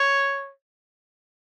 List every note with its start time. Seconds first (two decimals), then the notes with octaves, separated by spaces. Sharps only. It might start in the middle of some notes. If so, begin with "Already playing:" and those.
Already playing: C#5